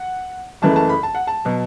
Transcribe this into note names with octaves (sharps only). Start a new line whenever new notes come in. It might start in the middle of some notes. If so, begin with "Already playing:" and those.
Already playing: F#5
F#1 F#2 C#3 E3 A3 A5
A5
B5
A5
F#5
A5
B2 F#3